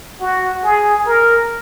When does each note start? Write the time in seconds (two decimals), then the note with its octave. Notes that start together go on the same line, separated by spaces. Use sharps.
0.21 F#4
0.64 G#4
1.06 A#4